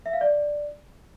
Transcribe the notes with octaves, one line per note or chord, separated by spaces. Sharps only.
E5
F5
D5